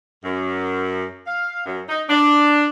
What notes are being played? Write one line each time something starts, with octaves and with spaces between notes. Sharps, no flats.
F#2
F5
F#2
D#4
D4